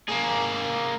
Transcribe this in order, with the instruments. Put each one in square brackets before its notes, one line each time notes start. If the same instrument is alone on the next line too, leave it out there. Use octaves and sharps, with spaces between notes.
[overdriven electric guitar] A#3 G#4